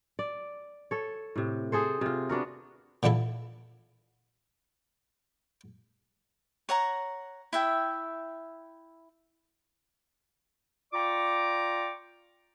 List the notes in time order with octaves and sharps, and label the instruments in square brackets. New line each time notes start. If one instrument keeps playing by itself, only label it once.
[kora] D5
A4 C#5
A2 C3
C4 G#4 A4 C5
C3 F4
B3 D4 F#4 A#4
[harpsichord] A#2 D3 E3 E4 A4
[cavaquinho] C#5 F#5 A#5
E4 E5 G5
[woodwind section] F4 D5 G5 A#5 C#6 D6